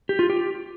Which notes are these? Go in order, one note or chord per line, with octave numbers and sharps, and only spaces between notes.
G4
F4
G4